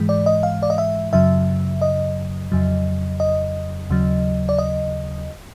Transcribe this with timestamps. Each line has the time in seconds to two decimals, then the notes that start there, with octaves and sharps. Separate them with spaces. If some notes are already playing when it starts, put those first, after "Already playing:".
Already playing: G#2 E3 G#3
0.09 D5
0.26 D#5
0.43 F5
0.63 D5
0.70 D#5
0.78 E5
1.13 F#2 C#3 F#3 E5
1.81 D#5
2.52 F2 C#3 F#3
3.20 D#5
3.90 D#2 C#3 F#3
4.49 D5
4.59 D#5